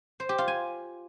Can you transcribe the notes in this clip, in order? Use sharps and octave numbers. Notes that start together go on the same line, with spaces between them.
C5
G4
F4
G#5